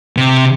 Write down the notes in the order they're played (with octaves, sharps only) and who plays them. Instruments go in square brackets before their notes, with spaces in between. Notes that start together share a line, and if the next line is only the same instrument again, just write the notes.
[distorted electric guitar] C3